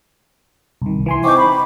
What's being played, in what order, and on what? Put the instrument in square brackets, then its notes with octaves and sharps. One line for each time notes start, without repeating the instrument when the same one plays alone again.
[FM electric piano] C2 D#3
E3 G#5 C6
[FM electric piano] C4 D#4 G5 [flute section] C#6 D6
[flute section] B5